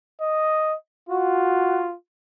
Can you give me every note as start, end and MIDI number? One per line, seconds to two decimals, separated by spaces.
0.21 0.76 75
1.09 1.94 65
1.09 1.85 66